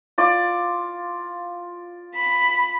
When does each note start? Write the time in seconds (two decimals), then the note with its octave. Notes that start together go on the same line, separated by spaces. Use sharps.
0.18 F4 D5
2.15 B5